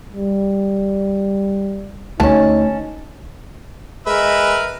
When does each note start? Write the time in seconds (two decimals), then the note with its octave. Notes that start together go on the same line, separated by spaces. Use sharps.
0.13 G3
2.20 D2 C#4 D#4 A5
4.07 G#3 A#4 B4 E5